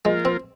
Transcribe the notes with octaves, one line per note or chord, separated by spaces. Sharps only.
F3 G#3 A#3 F4 A#4
C4